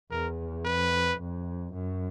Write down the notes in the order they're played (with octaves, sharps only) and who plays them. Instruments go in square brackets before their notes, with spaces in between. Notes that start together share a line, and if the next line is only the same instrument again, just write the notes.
[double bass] E2 [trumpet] A#4
[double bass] F2 [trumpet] B4
[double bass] F2
F#2